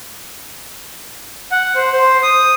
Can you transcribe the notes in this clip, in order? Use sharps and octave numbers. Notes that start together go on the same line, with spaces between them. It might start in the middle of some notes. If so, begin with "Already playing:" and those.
F#5
C5
C5
D#6